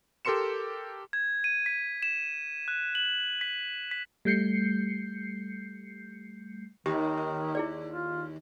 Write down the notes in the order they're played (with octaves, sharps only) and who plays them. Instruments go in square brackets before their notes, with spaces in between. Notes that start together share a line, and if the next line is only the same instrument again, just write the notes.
[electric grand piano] G4 A4 A#4 C6 C#7 E7
[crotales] G#6
D#7
B6
E7
F#6
F#7
B6
B6
[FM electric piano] G3 A3 G6 C7 C#7
[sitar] D#2 [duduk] D#3 [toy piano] G4 D#6
[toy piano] E4 G#4 D5
[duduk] F4